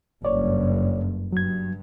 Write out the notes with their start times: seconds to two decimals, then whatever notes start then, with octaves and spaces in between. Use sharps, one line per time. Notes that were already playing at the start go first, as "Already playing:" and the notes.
0.25 F#1 G2 C#5 D5
1.32 G2 F#3 G#6